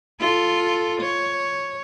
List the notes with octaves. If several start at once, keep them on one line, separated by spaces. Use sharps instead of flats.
F4 A4
C#5